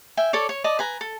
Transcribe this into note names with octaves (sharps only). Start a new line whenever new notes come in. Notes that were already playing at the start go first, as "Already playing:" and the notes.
E5 G5 G#5
A4 C#5 D5
C#5
D5 D#5 A5
B4 G#5 A#5
A4